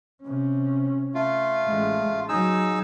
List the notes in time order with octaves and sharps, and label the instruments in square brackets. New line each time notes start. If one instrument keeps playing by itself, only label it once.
[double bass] C3 C#4
[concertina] A3 F4
[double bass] A1 G#3
[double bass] F#3 [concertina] D#4 G#4 E6